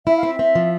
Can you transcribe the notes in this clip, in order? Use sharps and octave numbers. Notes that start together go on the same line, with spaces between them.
E4 E5
F5
C4 E5
C4
F3